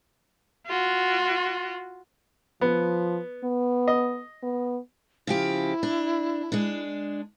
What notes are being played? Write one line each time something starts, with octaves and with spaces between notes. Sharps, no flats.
F4 F#4
F3 B3
B3
D#5
B3
C#3 F3 E4 G4
D4
G#3 D4